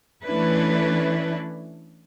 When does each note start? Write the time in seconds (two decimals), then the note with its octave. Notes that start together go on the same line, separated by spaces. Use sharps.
0.25 E3 A3 C#4 D4 E4 B4